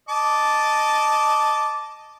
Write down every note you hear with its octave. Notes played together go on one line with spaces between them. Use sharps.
D#5 A5 D6